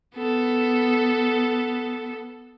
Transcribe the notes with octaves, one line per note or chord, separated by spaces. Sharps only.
B3 A4